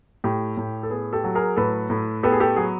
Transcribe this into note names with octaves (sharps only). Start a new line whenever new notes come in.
A2 G4
A2
A4
B3 G#4
G4 A4
F#3
G#4 A#4
A2 A4 B4
A2
B3 G4 A4
G#4
G4 A4
F#3 G#4